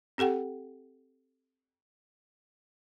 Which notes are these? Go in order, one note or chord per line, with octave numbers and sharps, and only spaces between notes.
C4 G4 A4 F#5 G5